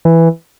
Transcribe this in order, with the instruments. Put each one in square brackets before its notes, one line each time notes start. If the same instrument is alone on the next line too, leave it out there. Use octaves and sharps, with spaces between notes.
[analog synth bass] E3